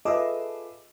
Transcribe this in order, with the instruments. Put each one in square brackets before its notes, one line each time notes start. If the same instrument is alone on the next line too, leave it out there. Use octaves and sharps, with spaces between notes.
[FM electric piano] F4 G#4 A4 [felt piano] B4 E5 D6 [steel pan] D#5